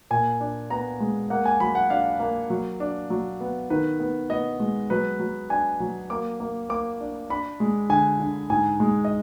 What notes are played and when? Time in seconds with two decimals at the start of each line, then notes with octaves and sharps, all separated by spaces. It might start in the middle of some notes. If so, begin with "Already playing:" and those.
0.11 A#2 G#5
0.40 D4
0.70 B3 A#5
1.00 G#3
1.30 A#3 F#5
1.45 G#5
1.60 F#3 B5
1.75 F#5
1.90 D4 F5
2.20 A#3
2.50 F#3
2.80 D4
3.10 F#3
3.41 B3
3.70 D#3 B4
4.00 B3
4.30 B3 D#5
4.60 G#3
4.90 F#3 B4
5.20 F#3
5.50 D4 G#5
5.80 F#3
6.10 A#3 D6
6.40 A#3
6.69 A#3 D6
7.00 D4
7.30 D4 B5
7.60 G#3
7.90 D3 G#5
8.20 D3
8.50 G#2 G#5
8.80 G#3
9.05 D#5